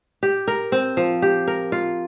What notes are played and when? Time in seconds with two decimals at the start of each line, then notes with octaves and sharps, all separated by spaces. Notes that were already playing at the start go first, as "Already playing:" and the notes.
0.23 G4
0.48 A#4
0.72 C4
0.97 F3
1.22 G4
1.48 A#4
1.72 F4